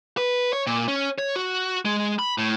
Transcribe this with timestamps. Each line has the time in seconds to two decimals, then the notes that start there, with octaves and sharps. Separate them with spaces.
0.17 B4
0.53 C#5
0.67 A#2
0.88 C#4
1.18 C#5
1.36 F#4
1.85 G#3
2.19 B5
2.38 A2